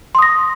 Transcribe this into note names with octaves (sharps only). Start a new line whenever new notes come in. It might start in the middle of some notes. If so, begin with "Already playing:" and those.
C6 D#6 A#6